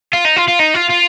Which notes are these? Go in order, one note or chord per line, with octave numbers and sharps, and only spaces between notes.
F4
D#4
F4
F4
D#4
F4
F4